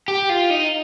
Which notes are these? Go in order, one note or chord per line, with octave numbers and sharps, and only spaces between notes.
G4
F4
D#4